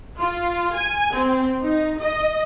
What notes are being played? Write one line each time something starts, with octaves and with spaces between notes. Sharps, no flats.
F4
G#5
C4
D#4
D#5